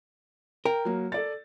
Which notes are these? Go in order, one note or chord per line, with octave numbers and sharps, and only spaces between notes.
A#4 G5
F#3 A#3
A4 D5 A6